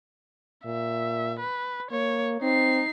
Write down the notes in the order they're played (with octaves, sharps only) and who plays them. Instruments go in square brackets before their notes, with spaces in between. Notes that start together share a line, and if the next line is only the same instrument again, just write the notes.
[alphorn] A#2 [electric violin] E5
[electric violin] B4
[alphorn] A#3 [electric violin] C#5
[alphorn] C4 [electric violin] D#4 C7